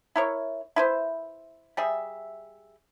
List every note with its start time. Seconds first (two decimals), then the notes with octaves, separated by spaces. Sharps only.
0.16 E4 A#4 C#5
0.76 E4 B4 C5
1.77 G3 G#4 E5